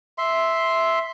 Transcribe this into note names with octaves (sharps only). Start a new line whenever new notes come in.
E5 C6